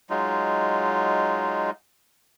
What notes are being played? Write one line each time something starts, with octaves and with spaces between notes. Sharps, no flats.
F#3 G#3 D#4 F4